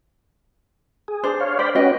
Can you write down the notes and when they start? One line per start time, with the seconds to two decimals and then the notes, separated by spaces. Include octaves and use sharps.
1.08 G#4
1.24 D4 C5
1.40 C#5 F5
1.59 C5 D5 G5 B5
1.75 C#4 F#4 B4 D#5 G5